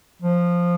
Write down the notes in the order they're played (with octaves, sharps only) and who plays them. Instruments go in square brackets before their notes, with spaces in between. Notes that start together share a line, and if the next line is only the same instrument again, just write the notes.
[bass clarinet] F3